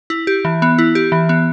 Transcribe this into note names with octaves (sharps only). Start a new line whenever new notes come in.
E4
G4
E3
B3
E4
G4
E3
B3